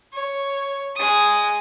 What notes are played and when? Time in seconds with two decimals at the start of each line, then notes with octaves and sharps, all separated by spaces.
0.13 C#5
0.95 G#3 D#6